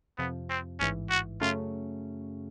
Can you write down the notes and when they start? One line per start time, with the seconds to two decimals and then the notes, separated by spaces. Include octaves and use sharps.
0.18 F2 C3 F3 B3
0.49 C4
0.79 A1 G#2 E3 C#4
1.10 F#4
1.41 F#2 C#3 F#3 A3 C#4 F4